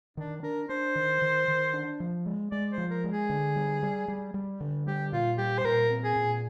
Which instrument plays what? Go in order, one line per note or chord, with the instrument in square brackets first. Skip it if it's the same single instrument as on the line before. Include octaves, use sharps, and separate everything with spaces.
[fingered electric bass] D#3 [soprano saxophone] D4
[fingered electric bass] D4 [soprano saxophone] A#4
[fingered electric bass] D4 [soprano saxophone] C5
[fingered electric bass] D#3
D#3
D#3
D4
F3
G#3
[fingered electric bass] G#3 [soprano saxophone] D5
[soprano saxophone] C5
[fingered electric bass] F3
[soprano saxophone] A#4
[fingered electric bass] G#3
[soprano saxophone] G#4
[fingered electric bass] D3
G3
G3
G3
G3
D3
[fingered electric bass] G3 [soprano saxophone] G4
[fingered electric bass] A#2 [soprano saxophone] F4
[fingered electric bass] G3 [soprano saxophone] G4
[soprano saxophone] C5
[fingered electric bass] A#2 [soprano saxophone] A#4
[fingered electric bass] C4
[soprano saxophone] G#4
[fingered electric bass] A#2